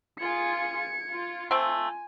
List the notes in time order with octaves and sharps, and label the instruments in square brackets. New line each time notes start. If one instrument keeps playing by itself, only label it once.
[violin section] F4 G#4 [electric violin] G#6 C#7
[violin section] F4
[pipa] A3 C4 [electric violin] G#5